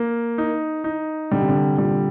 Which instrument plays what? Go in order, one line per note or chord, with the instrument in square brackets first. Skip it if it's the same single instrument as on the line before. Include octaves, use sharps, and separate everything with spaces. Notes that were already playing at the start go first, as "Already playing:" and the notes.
Already playing: [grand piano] A#3
D#4
D#4
[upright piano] D3 [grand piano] G3
[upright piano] C3
D3
[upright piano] A#2 [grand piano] G3